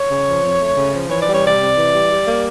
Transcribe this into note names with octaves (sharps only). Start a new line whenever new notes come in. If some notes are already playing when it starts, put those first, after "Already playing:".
Already playing: C#5
C#3
F3
F2
A3
C#3
F3
E3 C#5
G3 D5
C#5
C3 D5
C3
E3
G3
G3
A#3